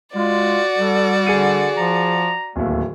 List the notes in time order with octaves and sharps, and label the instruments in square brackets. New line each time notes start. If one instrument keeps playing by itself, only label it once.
[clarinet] G#3 [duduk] F4 [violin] F#4 D5
[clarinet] G3 [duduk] A4
[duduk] D3 [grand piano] G#4 C#7 D#7
[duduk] F3 [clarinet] A#5
[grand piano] D1 D#2 [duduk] A3